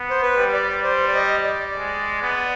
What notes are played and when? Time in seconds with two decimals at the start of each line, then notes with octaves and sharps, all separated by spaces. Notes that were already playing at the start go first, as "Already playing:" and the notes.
Already playing: B3
0.10 C5
0.22 B4
0.37 G3
0.53 D5
0.83 C5
1.07 D5
1.15 D#5
1.44 D5
1.76 G#3
2.22 B3